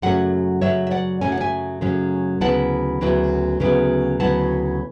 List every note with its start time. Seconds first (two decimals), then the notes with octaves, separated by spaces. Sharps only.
0.02 F#2 C#3 F#3 A3 C#4 F#5
0.62 F#2 C#3 F#3 C#5 E5
0.87 E5
0.91 D5 F#5
1.21 F#2 C#3 F#3 A3 C#4 G#5
1.32 F#5
1.40 E5 G#5
1.81 F#2 C#3 F#3 A3 C#4
2.41 D2 C#3 F#3 B3 E4 F#5 A5
3.01 D2 C#3 F#3 B3 E4
3.60 D2 C#3 F#3 B3 E4
4.20 D2 C#3 F#3 B3 E4 F#5 A5